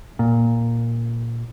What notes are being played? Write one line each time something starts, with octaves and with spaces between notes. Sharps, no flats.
A#2